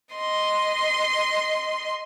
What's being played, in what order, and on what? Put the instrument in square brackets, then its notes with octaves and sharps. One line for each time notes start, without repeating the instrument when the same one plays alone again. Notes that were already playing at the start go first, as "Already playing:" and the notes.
[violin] D#5 C6